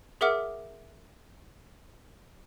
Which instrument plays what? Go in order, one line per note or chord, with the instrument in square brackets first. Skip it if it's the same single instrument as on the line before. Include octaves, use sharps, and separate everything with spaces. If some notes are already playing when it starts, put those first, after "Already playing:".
[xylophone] G#4 A#4 E5 F#5 D6 F6